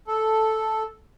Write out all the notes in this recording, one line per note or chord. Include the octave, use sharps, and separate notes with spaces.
A4